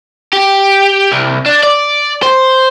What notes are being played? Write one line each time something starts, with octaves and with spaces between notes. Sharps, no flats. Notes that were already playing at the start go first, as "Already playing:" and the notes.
G4
C2
D4
D5
C5